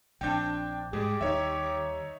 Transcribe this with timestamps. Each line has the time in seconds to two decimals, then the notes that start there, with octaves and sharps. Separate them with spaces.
0.21 A#1 C4 D4 G5 G6
0.93 G#2 G3 G4 G#4
1.21 D#2 D#4 C#5 E5